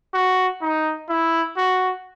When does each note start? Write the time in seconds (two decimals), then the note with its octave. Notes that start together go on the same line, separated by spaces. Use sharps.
0.14 F#4
0.62 D#4
1.09 E4
1.57 F#4